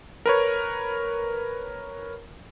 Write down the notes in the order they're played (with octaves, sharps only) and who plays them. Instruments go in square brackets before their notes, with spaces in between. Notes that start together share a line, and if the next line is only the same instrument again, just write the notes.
[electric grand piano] A#4 B4 C#5